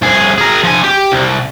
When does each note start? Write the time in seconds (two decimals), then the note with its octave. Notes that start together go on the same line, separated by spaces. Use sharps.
0.02 C2 G#4
0.38 G#4 A#4
0.64 F3 G#5
0.84 G4
1.12 C2